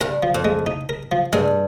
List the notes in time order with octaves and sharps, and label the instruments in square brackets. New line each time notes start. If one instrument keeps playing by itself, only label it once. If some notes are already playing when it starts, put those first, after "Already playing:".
[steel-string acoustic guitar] G2 [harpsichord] A#4
[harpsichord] F3
[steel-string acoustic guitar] F2
[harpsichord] G#3
D#4
A#4
F3
[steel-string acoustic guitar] G2 [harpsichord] G#3